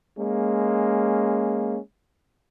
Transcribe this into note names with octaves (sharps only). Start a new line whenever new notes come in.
G#3 A#3 C#4